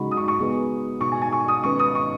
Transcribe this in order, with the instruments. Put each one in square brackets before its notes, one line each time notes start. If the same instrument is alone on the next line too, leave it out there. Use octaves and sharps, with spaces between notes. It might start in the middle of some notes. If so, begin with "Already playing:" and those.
Already playing: [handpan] C#3 G#3 D#4 F#4 [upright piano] B5
[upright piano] D#6
C#6
C#6
[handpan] C#3 B3 G#4 B4
[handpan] B2 G#3 D#4 F#4 [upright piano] C#6
[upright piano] G#5
G#5
C#6
D#6
[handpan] D#3 G#3 C#4 B4 [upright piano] C#6
[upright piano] D#6
C#6